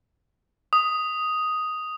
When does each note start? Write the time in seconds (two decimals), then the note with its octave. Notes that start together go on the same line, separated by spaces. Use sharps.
0.73 D#6